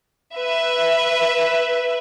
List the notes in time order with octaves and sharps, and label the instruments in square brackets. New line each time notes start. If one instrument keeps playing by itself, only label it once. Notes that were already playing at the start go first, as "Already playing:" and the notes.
[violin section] B4 E5